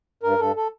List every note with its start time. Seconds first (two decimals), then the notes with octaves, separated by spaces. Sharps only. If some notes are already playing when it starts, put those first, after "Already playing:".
0.23 G2 A#4
0.39 G2 A4
0.56 A4